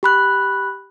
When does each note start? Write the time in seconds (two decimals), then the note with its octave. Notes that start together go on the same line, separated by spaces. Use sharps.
0.03 G4 B5 F#6